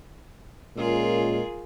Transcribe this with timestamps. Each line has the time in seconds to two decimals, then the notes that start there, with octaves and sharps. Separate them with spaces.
0.77 A#2 G#3 C#4 F4 G#4 A#4